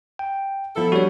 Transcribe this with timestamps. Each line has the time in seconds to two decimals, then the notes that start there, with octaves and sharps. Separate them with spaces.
0.19 G5
0.76 F3 B3 E4 A4
0.92 G3 D4 F#4 C#5